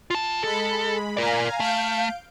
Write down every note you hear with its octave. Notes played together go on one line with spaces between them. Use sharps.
F4 A5
G#3 A4 B5
A#4 D5 F5 G#5 A#5
A3 F5 G6 D7